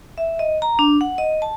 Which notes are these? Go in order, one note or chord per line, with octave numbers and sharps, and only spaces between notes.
E5
D#5
A#5
D4
F#5
D#5
A5